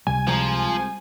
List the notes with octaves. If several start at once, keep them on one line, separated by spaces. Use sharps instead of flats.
C#2 C3 G3 G#5
C2 F3 G#3 A#5